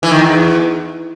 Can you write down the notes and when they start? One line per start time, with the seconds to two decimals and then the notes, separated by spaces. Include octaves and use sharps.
0.03 E3
0.11 D#3
0.19 E2